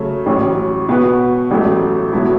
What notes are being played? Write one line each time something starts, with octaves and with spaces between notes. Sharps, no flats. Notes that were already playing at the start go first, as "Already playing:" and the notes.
Already playing: C#3 F#3 A3 C#4
A1 A2 F#3 C#4
B2 B3 F#4 B4
A1 A2 F#3 A3
B2 F#3 A3 E4